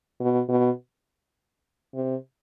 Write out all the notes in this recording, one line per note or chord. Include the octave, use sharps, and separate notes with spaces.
B2
B2
C3